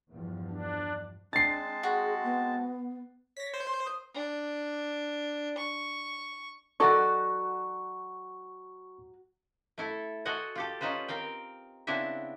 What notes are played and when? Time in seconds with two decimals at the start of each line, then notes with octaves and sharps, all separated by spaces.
0.11 E2 G2 F3
0.50 D4
1.33 G#3 C4 D4 A5 A6 C7
1.83 F#4 G#4
2.23 B3
3.37 C#5 A#6 B6
3.54 C5
3.67 C6
3.85 D#6
4.14 D4
5.57 C#6
6.80 F#3 D#4 F#4 A4 D5 C#6
9.78 A3 E4 A4
10.25 F#4 A4 C5 D#5 F#5 G#5
10.55 F4 G4 A4
10.81 C#4 D#4 F4 B4 C5
11.08 C4 A#4 F5 G5
11.87 C#3 B3 C4 D4 E4 E5